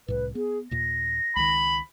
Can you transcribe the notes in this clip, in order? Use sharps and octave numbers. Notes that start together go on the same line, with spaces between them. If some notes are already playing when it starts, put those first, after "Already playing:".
C2 A2 B4
B3 G#4
D#2 A#2 A#6
C#2 D#3 B5